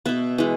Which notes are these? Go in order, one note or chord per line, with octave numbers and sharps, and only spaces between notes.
B2 B3 E5
E3 G#3